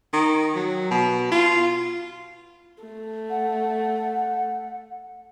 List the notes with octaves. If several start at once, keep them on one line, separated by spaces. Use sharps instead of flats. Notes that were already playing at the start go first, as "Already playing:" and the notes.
D#3
F#3
B2
F4
A3
F#5